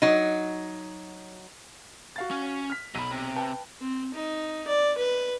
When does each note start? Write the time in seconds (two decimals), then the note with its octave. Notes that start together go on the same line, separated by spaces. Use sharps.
0.02 F#3 D#4
2.16 F#4 F5 A6
2.31 C#4
2.70 F6 B6
2.95 B1 F#3 B5 B6 D#7
3.10 C3
3.36 B4 G5 A5
3.81 C4
4.14 D#4
4.67 D5
4.98 B4